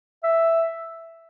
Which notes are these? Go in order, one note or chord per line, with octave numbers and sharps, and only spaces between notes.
E5